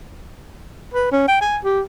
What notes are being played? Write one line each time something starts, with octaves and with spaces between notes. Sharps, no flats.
B4
C#4
G5
G#5
G4